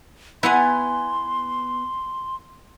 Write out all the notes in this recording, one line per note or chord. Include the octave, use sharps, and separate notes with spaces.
B3 E4 F#5 G#5 C6